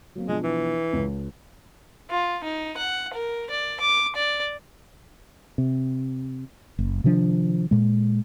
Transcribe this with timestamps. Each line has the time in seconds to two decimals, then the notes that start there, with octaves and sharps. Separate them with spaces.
0.15 F#3 A#3 C4
0.28 B2 F3 G#3 D4
0.44 E3
0.93 C#2
2.10 F4
2.44 D#4
2.77 F#5
3.13 A#4
3.50 D5
3.80 D6
4.16 D5
5.58 C3
6.79 F#1
7.04 C3 D#3 F3 D4
7.71 A#2 G#3